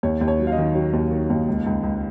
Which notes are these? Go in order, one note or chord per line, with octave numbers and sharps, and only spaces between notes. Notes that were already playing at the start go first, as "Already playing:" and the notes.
D#2 C#5
D#2
C#5
F#3
F5
D#5
D#3
F#3
D#2
D#3
D#2
C#2
C#2
C#2